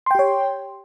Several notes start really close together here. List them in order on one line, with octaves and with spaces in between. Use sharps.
C6 G5 G4 C#5